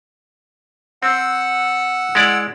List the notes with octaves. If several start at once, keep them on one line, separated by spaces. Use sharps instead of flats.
C4 F#5 E6
G#3 E4 D5